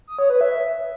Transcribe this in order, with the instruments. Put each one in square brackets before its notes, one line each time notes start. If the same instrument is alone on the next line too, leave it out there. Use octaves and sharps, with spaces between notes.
[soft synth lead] D#6
C#5
B4
E5